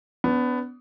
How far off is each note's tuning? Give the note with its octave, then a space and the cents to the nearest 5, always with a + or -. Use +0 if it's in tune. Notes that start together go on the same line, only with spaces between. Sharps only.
B3 +15 D4 -35